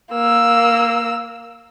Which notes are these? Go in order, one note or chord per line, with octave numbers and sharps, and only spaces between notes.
A#3 E6